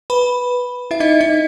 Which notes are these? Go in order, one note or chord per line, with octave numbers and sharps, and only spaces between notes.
B4 B5
E4 E5
D#4 D#5
D#4 D#5